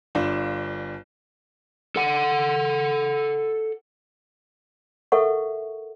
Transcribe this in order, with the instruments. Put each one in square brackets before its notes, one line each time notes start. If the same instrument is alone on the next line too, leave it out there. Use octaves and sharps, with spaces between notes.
[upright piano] G1 D4 F4
[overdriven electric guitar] A4 F#5
[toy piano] A4 A#4 E5 F#5 C#6